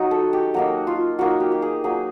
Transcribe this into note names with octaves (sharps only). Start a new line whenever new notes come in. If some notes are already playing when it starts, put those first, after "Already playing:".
Already playing: F#3 D#4 F#4
A4
G4
F#3 A#3 D#4 F#4
F4
F#3 A#3 D#4 F#4
G4
G4
G#4
F#3 A#3 D#4 G#4